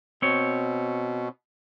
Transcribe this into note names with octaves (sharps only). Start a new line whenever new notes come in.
B2 C4 C#5